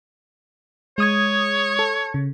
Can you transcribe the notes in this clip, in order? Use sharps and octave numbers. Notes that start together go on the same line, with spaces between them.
G#3 C#5 D#6 G#6
A4
C#3